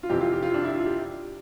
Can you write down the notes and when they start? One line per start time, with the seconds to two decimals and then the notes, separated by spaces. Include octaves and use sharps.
0.03 F4
0.09 F2 C3 E3 G4
0.21 F4
0.32 G4
0.43 F4
0.54 D4
0.64 E4
0.75 F4
0.86 G4